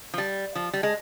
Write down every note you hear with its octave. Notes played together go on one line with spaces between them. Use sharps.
F3
G3
F3
G3
G#3